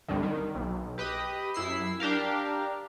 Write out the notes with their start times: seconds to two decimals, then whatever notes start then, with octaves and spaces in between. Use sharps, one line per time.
0.08 C2 G2 D3
0.23 D#3
0.55 B1
0.98 G4 B4 D#5 D#6
1.54 F#2 E4 E6 C7
2.00 D4 G4 A#4 F5